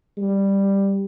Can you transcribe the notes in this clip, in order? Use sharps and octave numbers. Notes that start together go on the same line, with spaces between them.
G3